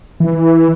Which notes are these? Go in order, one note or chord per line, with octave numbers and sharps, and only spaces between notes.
E3